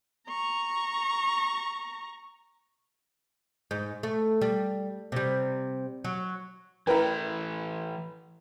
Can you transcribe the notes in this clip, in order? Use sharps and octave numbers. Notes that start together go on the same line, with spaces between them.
A#5 C#6
G#2
A3
G3
C3 G3
F#3
E3 A3 E4 A#4 B4 G5 A#5